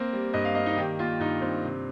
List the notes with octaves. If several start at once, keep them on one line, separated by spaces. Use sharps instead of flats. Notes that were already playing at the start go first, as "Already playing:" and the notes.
Already playing: A#3 C4
G3
G2 D#5
F5
A#3 D#5
D#4
D#3 G4
A#3 F4
G2 D#4
G2 C4
C3